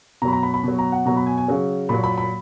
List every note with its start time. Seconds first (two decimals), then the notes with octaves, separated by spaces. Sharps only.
0.22 B2 A#5
0.25 F#3 B5
0.33 A#5
0.43 B5
0.54 B5
0.64 B2 F#3
0.79 A#5
0.92 F#5
1.06 B2 F#3 A#5
1.17 B5
1.26 G#5
1.38 G#5
1.48 C#3 F#3
1.89 A#2 F#3 B5
2.04 B5
2.18 B5